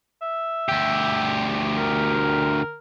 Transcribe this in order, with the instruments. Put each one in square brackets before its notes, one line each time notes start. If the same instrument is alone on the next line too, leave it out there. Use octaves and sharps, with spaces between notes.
[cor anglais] E5
[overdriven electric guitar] D2 G4
[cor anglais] A#4